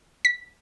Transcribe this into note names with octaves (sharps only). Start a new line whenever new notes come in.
B6